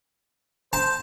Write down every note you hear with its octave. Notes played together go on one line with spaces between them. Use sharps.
C5 A5